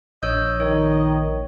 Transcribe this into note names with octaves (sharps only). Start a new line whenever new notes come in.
A#1 C#5 D#5 E6 G6
D#3 C#5